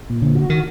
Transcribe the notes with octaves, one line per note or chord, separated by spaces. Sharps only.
A#2
D3
F#4
D#3